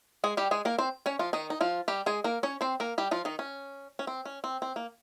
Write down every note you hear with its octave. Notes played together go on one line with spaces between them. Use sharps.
G#3 G#4
G3 G4
G#3 G#4
A#3 A#4
C4 C5
C#4 C#5
F3 F4
D#3 D#4
D#4
F3 F4
G3 G4
G#3 G#4
A#3 A#4
C#4 C#5
C4 C5
A#3 A#4
G3 G4
F3 F4
D#3 D#4
C#4
C#4
C4
C#4
C4
C4
A#3